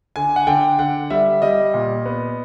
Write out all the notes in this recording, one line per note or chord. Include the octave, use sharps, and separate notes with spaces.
D3 G#5
F#5
D3 G5
D3 F#5
G3 E5
G3 D#5
A#2
B3